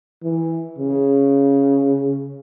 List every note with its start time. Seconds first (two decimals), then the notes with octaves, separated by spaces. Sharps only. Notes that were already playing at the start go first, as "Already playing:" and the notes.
0.23 E3
0.78 C#3